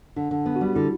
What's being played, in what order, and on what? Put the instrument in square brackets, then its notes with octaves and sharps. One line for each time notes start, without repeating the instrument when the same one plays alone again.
[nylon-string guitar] D3 [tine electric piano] D4
[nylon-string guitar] D3
B3
[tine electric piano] F#4
[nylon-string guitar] G3
[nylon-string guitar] D3 [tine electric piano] E4